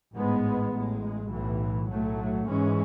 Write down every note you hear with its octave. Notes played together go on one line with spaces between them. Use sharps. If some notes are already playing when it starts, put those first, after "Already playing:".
A1 G#2 G#3 B3
A1 A2 G#3
B1 A2 E3
B1 A2 F#3 A3
G#2 E3 G#3 C#4